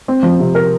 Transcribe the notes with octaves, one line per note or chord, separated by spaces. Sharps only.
C4
F3
C3
A#4